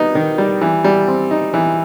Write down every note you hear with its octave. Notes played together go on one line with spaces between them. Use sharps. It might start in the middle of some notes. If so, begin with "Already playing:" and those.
Already playing: G3 B3 D#4
D#3
G3
E3
G3
C4
D#4
E3